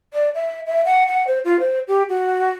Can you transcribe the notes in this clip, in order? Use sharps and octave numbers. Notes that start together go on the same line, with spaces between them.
D5
E5
E5
F#5
F#5
C5
F4
C5
G4
F#4